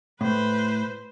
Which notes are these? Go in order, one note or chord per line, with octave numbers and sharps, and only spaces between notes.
A2 B4 C5